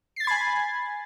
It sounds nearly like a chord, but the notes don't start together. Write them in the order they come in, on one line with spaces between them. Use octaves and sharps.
C7 A6 G#6 B5 G#5